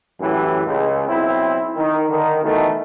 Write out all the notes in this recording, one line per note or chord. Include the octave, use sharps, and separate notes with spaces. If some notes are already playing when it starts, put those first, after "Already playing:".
F#2 A2 E3 A3 G4
C#2
B1 C4 E4
D#3
D3 D#3
B2 D#3 E3 A3